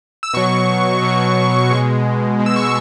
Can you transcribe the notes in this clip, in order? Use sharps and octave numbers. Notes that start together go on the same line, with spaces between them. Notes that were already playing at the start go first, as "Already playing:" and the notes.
E6
B2 F#3 C#6
B2 F#3
B2 G#3
B2 G#3
E6
C#6